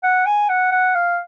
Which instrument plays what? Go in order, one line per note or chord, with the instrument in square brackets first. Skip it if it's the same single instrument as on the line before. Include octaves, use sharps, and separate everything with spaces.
[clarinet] F#5
G#5
F#5
F#5
F5